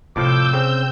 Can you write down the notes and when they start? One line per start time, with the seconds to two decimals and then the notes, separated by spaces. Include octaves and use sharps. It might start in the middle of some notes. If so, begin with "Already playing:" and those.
0.16 F2 A2 C3 F3 D6 E6 G6
0.53 C#3 C4